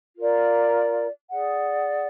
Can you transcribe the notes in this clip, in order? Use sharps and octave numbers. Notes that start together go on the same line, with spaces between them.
F4 A#4 D5
G#4 D5 F#5